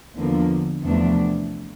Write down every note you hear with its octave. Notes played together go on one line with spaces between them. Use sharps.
E2 D3 F3 A#3
E2 C3 F3 A3 D4